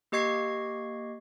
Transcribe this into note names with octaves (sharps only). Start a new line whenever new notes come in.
A#3 G4 D#5 C#6 G#6 C7